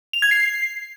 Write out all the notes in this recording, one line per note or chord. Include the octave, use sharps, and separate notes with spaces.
F7
G#6
C7